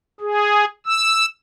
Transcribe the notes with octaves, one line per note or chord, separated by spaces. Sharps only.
G#4
E6